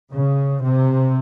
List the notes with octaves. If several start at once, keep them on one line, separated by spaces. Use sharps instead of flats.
C#3
C3